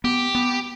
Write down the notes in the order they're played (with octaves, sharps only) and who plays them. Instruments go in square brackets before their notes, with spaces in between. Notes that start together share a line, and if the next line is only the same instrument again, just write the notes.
[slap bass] B3 [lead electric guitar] G4
[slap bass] B3